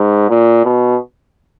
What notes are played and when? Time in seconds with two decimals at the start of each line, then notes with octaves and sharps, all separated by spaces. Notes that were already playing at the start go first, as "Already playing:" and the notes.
Already playing: G#2
0.30 A#2
0.65 B2